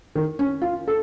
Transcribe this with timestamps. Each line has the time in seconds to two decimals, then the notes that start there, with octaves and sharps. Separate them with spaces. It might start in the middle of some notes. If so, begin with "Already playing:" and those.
0.15 D#3
0.39 C#4
0.62 F4
0.88 A4